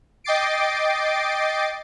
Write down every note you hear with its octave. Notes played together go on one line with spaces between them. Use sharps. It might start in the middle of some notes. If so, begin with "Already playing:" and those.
D#5 G5 D6 A6 C7 D7